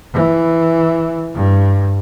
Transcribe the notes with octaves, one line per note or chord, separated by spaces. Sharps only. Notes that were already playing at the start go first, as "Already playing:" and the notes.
E3
G2